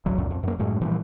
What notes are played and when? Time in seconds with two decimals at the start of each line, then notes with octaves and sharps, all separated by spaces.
0.06 A1 D2 F#3
0.18 C#2 F#2 A#2
0.31 F2
0.43 F#2 A#3
0.59 F#2 A2 G#3
0.81 A#2 E3 F3 G3